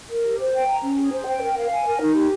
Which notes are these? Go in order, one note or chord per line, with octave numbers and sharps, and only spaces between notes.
A#4
G4
C5
G5
A#5
C#4
G#4
C5
G5
A#4
F5
G#5
A#4
D#4
G4